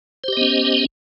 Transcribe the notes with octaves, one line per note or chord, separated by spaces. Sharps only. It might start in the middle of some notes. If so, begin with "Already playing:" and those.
B3 C#4 G4 C5 D#5